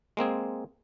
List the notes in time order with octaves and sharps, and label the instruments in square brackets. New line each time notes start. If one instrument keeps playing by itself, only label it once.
[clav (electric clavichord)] G#3 A#3 C4 G#4